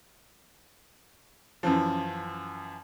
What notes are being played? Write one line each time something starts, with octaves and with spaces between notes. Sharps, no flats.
F#2 E3 F3